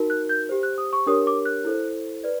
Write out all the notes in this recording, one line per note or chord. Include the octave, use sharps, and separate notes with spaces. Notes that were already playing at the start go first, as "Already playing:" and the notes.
Already playing: D#4 F#4 A#4
F#6
G6
G4 C5
F#6
D#6
C#6
D4 G4 A#4 C#5 D#6
D6
F#6
E4 A4 C5
B4 D5